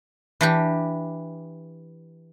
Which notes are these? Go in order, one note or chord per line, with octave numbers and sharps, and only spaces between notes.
E3 D4 G4